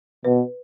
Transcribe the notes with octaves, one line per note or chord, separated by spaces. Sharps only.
B2 B4